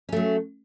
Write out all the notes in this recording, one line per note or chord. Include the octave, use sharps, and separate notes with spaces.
F#3 A3 C#4